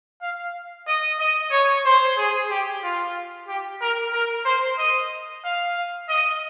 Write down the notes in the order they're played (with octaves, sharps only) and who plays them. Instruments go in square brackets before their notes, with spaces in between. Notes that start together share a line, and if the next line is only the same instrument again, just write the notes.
[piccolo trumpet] F5
D#5
D#5
C#5
C5
G#4
G4
F4
G4
A#4
A#4
C5
D#5
F5
D#5